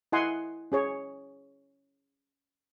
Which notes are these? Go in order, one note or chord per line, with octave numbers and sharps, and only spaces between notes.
E4 D#5 F#5 G#5 C6
C#4 G#4 C#5